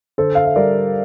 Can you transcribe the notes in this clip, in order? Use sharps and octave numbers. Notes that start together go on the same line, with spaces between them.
D3 A4 C5
F5
E5
G3 A#4 D5